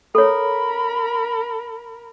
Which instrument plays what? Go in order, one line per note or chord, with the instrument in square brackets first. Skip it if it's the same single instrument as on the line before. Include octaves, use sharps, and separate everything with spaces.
[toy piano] A4 C#5 [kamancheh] A#4 B5